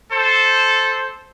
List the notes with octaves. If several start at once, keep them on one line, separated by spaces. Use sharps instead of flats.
A4 C5